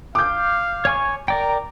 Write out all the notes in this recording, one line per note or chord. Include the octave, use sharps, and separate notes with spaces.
F5 D6 G6
C#5 G#5 C#6
A#4 D5 G5 A#5